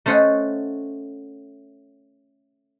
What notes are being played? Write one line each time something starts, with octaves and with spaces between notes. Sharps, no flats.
A3 C#4 C5 C#5 D#5 F#5